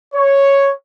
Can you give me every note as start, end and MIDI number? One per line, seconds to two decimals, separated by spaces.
0.14 0.72 73